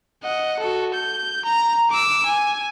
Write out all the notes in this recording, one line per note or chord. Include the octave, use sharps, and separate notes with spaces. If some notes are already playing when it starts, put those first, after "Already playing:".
D#5 F#5
F#4 A4
G6
A#5
D6 E6
G#5